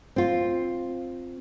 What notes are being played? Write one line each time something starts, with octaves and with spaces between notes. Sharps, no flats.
C4 F4